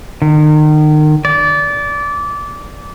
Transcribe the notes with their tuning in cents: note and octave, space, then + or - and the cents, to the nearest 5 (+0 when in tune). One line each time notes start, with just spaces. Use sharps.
D#3 -35
D5 -20